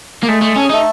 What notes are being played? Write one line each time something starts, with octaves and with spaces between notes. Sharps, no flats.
A#3
G#3 A3 G#4
A3
C#4 A4
G#4
A3 D#4 A4